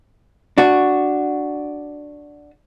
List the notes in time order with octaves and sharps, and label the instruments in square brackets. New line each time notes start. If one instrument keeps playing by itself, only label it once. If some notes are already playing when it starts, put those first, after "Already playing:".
[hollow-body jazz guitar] D4 F#4